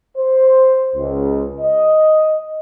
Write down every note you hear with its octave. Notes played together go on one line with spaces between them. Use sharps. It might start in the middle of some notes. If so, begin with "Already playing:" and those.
C5
C#2
D#5